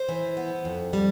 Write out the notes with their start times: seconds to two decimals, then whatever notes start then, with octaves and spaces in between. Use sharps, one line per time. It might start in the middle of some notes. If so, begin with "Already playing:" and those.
Already playing: C5
0.09 E3
0.37 B3
0.65 F2
0.93 G3